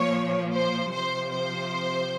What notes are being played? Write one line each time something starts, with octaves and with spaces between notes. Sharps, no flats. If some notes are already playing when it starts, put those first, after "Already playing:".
Already playing: A#2 F3 C#5
C5
C3 F3 C5
C5